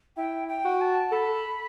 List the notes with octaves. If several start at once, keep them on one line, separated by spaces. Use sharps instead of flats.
E4 G5
G5
F#4
A5
A4 B5